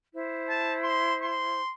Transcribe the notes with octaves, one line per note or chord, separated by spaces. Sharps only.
E4 C5
A5
C6
C6